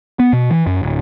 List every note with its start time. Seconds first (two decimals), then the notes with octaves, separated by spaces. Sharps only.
0.20 B3
0.33 B2
0.51 E3
0.67 F#2
0.83 D1